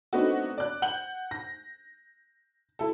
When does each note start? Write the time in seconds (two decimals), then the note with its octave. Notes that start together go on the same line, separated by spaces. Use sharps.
0.13 A3 B3 C4 D4 D#4 F#4
0.58 D5 F#6
0.82 F#5 G6 F#7
1.31 A#6
2.79 E4 A4